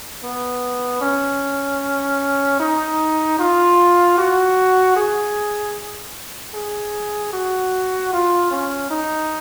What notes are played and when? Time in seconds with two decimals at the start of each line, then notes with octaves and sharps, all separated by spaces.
0.23 B3
1.01 C#4
2.60 D#4
3.39 F4
4.18 F#4
4.97 G#4
6.54 G#4
7.33 F#4
8.13 F4
8.51 C#4
8.91 D#4